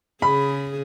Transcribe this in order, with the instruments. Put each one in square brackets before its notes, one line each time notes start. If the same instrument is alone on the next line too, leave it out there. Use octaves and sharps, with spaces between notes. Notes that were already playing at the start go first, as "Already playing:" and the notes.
[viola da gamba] C#3 G#4 [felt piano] B5